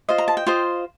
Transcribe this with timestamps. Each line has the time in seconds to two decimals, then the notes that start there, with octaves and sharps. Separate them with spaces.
0.09 F4 C5 D#5
0.18 A#5
0.28 A5
0.37 G5
0.47 F4 C5 D#5